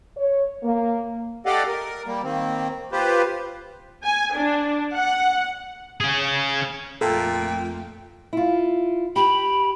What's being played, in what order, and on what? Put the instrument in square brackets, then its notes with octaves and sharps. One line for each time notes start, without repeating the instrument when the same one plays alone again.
[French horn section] C#5
A#3
[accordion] G4 A4 D5 D#5 F5 F#5
A#4
G3 A#3
D#3 A#3 C4
F4 G4 B4 C5
[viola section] G#5
D4
F#5
[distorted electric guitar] C#4 G#4
[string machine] F2 A3 F4 [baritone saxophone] A#2 [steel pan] A4 [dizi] G5
[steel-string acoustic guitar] E4 F4
[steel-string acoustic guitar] G4 [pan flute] B5